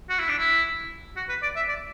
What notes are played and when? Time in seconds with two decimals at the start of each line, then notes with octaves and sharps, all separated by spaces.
0.10 F#4
0.19 E4
0.29 D4
0.39 E4
1.17 F#4
1.29 B4
1.43 D5
1.56 E5
1.69 D5